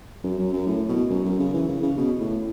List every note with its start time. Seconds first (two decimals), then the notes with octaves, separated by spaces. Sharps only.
0.23 F#2
0.38 F#2
0.53 F#2
0.67 A2
0.89 B2
1.10 F#2
1.25 F#2
1.39 C#3
1.54 E3
1.68 C#3
1.83 C#3
1.97 B2
2.20 A2